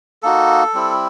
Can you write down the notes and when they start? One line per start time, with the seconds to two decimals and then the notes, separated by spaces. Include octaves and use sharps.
0.23 A#3 D#4 F#4 A4
0.74 G3 C4 E4